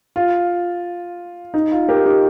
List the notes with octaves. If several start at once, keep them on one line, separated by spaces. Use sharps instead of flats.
F4
D#4
F4
G4 A#4
D#4 G4